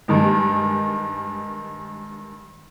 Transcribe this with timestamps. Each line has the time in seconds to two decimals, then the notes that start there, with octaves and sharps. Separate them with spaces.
0.08 G2 D#3 G#3